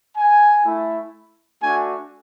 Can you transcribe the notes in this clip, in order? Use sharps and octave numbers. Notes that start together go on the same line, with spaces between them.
G#5
A3 E4
A3 D4 F#4 G#5